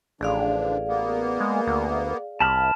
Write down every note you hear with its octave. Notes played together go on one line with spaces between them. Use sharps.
A1 D3 F3 D4 G#4 D5 F5
A#3 B3
G#3
D2
C2 A5 B5 F6